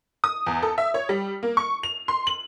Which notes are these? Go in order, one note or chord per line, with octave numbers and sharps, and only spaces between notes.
D#6
E2
A4
E5
C#5
G3
A#3
C#6
F7
C6
F#7